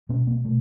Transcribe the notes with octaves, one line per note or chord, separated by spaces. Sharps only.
B2 B3 C#4
A#3 C4
B2 A3